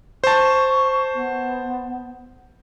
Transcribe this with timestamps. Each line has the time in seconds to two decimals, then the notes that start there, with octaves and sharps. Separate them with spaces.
0.24 C5 A5 C#6
1.14 B3